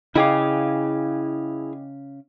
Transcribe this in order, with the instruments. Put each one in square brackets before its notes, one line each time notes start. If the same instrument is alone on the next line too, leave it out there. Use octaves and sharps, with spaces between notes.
[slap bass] C#3 [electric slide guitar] E4 G#4 F5 [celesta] D#5 G5 D6